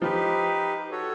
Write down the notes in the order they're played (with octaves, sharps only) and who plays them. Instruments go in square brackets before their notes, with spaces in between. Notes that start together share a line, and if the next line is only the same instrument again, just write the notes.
[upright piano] F3 [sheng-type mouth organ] D#4 G4 B4
[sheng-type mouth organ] F#4 A4 C#5